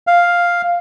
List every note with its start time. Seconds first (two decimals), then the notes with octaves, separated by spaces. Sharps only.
0.07 F5